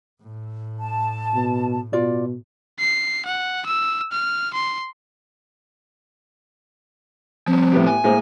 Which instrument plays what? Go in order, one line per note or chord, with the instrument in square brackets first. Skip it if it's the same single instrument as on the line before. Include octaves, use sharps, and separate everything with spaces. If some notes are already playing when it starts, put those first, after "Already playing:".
[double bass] A2
[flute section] A5
[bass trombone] B2
[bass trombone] B2 [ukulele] F4 D5
[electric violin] C7
F#5
E6
F6
C6
[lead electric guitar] F3 G3 [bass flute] C4
[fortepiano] A2 B3 G4
[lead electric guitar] G#5
[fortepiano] A2 G#3 A#3 [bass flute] C5